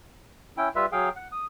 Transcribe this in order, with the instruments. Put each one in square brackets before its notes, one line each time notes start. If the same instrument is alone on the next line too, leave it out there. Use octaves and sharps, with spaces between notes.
[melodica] C#4 E4 G5
G3 F4 B4 E5
F#3 G#4 F5 G5
F#5
D#6